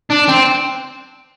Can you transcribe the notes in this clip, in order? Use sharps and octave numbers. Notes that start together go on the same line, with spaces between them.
D4
C4